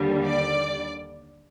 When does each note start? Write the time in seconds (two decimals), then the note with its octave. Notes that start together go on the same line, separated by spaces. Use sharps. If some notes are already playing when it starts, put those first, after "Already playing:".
Already playing: D#2 D3 G3
0.25 D5